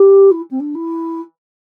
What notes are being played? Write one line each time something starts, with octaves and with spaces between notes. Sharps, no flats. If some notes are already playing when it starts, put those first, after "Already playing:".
Already playing: G4
E4
C4
D4
E4